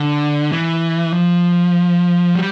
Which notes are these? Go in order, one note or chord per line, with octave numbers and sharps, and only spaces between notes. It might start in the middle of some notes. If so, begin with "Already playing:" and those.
Already playing: D3
E3
F3
G3